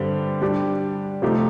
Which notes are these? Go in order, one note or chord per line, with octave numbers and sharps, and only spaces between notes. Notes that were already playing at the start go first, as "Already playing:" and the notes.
Already playing: G2 D3 G3 C4 G4
G3 D4 G4
C3 F3 A3 D#4 G4